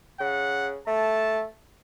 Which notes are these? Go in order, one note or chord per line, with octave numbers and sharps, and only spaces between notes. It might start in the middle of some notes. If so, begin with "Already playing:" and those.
C#3 F#5
A3 A5